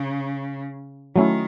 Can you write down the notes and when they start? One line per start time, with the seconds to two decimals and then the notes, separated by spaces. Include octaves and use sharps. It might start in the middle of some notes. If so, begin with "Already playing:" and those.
Already playing: C#3
1.16 D#3 F#3 A3 C#4 E4